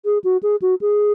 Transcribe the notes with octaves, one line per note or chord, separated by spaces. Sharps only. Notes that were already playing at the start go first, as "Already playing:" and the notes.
G#4
F#4
G#4
F#4
G#4